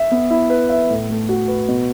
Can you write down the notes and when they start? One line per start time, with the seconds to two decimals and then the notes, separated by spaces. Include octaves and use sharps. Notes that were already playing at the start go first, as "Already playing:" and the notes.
Already playing: E5
0.11 B3
0.30 E4
0.50 B4
0.69 E5
0.90 A2
1.10 A3
1.29 F#4
1.48 B4
1.68 B2